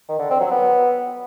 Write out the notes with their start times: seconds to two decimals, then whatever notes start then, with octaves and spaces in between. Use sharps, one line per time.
0.09 D#3
0.19 D3
0.30 C4
0.40 F#3
0.51 B3